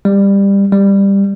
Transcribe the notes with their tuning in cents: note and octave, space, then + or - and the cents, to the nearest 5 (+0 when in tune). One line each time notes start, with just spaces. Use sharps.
G3 +20
G3 +15